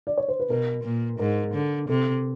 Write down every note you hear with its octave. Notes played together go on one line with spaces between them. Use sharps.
D5
C#5
C5
B4
B2 A#4
A#2
G#2 A#4
D3
C3 A4